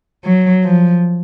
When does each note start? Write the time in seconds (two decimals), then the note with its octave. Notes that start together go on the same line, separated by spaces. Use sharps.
0.25 F#3
0.64 F3